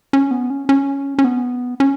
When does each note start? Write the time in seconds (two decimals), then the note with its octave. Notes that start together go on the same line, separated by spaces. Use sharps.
0.13 C#4
0.31 B3
0.50 C#4
0.69 C#4
1.19 C#4
1.24 B3
1.80 C#4